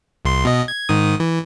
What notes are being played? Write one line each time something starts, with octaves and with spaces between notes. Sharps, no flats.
C2 C6
B2 D#5
G#6
G#2 D#3 D#6
E3